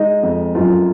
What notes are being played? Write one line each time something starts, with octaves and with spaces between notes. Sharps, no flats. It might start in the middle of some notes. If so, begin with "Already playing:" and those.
Already playing: G#3 D#4 D#5
F2
F#2 F4